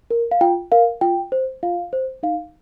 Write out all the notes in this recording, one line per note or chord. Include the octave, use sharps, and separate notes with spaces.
A#4
F5
F4 G5
A#4 F5
F4 G5
C5
F4 F5
C5
D#4 F5